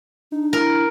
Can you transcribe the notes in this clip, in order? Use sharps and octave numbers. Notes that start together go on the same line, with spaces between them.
D4 D#4
E4 A#4